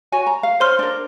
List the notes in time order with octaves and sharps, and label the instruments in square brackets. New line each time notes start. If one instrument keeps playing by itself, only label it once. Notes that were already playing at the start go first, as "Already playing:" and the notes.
[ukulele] F#4 C#5 G#5
A#5
F5
[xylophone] C5 C6 F6 [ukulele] C#5
[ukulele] D4 A#4